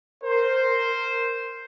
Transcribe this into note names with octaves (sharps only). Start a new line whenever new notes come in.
A#4 C5